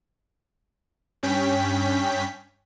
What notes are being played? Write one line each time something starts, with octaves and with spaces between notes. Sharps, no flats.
G2 C#4 G5 B6